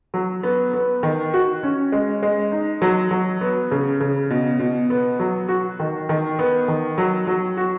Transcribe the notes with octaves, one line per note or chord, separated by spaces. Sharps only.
F#3
B3
B3
D#3
F#4
C#4
G#3
G#3
D#4
F#3
F#3
B3
C#3
C#3
B2
B2
B3
F#3
F#4
D#3
D#3
B3
D#3
F#3
F#3
F#4